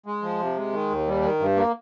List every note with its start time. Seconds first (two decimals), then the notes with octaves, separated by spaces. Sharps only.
0.06 G#3
0.22 F3
0.40 C3
0.57 G#3
0.73 D#3
0.90 D#2
1.07 G3
1.23 D#3
1.40 G2
1.56 A#3